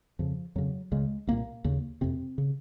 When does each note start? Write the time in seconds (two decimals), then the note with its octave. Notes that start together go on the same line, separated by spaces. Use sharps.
0.19 F2 C#3 F3
0.55 F2 C#3 F#3
0.91 C#2 C#3 G#3
1.27 C2 A#2 A#3
1.64 D#2 C#3
2.01 F2 C3 C4
2.38 C#3